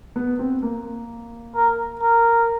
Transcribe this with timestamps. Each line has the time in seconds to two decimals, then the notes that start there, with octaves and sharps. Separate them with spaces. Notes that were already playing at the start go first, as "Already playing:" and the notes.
0.16 B3
0.39 C4
0.63 A#3
1.56 A#4
2.02 A#4